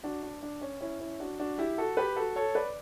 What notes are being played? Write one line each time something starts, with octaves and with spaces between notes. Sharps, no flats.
D4 F#4
D4
D4
C#4
C#4 E4
C#4 E4
D4 F#4
D4 F#4
E4 G4
F#4 A4
G4 B4
F#4 A4
A4 C#5
B4 D5